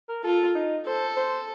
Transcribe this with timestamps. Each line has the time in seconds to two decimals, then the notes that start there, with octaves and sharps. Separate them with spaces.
0.09 A#4
0.24 F4 A4
0.55 D#4
0.86 A4 C5
1.17 C5